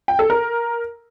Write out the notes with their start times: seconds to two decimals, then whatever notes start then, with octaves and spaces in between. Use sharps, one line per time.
0.08 G5
0.19 A4
0.30 A#4